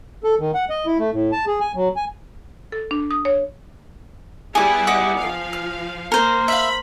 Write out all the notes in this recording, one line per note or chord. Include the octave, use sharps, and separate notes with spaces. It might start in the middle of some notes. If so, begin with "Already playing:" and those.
A4
D#3
F#5
D#5
E4
A3
A2
A5
G#4
G#5
F#3
G#5
A4
D4
D#6
C#5
G3 B3 E4 G#4 G#5 D6
D#4 F#5 D6
F3 F5
F6
A#3 A#4 C5
E5 F5 B5